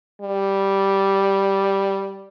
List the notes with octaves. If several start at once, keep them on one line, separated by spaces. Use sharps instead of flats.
G3